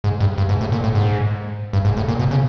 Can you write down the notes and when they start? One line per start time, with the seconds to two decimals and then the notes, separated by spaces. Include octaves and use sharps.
0.04 G#2
0.20 G2
0.38 G2
0.49 G#2
0.61 A2
0.72 A#2
0.84 A2
0.95 G#2
1.73 G2
1.85 G#2
1.97 A2
2.08 A#2
2.19 B2
2.31 C#3